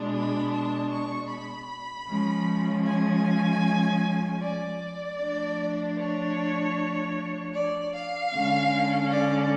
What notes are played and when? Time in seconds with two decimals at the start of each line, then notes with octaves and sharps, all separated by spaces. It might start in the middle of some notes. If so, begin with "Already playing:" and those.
Already playing: B2 G#3 D4
0.12 B5
0.51 A5
0.90 C#6
1.29 B5
2.07 F3 G#3 C#4
2.86 G#5
4.42 D5
5.21 F3 A3 D4
5.98 C#5
7.54 D5
7.94 F5
8.33 D3 G#3 C#4
9.11 D5